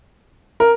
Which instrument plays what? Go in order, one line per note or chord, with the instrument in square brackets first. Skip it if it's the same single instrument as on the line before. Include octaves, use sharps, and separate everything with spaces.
[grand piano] A#4